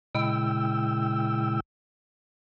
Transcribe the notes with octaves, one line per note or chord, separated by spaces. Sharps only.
A#2 C#3 G#3 E4 G5 E6